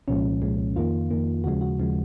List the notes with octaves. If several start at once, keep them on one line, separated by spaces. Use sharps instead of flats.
C2 A#2 F3 G#3 C#4
C2 A#2 F3 G#3
F2 D#3 A#3 F4
F2 D#3 A#3
D#2 C#3 F3 G#3 F#4
F#4
D#2 C#3 F3 G#3